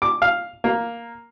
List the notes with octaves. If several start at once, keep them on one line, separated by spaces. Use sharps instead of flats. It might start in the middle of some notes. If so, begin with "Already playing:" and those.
D6
F5
A#3